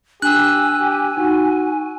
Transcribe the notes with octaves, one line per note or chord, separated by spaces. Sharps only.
D4 G4 G#5 E6 F#6
G4
D#4 F#4